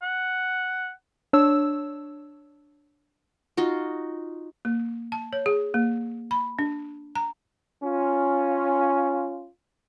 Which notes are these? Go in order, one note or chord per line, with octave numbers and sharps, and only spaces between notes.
F#5
D4 C#5 E6
D#4 F4 F#4
A#3
A5
C#5
G#4
A#3
B5
D4
A#5
C#4 F4